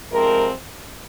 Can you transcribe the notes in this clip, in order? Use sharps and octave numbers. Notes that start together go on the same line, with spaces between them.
C3 F3 G#3 C4 A#4